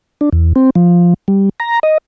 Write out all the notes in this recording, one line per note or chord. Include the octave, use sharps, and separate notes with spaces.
D4
E2
C4
F3
G3
A#5
D#5